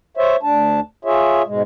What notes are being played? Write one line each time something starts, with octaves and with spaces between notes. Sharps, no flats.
C5 C#5 E5
D2 D4 A5
F4 G#4 C#5 E5
G#2 B2 G#3